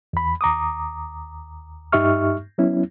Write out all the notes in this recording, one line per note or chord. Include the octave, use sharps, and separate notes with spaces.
E2 B5
D#2 A#5 D6 D#6
G2 D#4 G4 E5 C#6 F6
F#3 B3 C#4 E4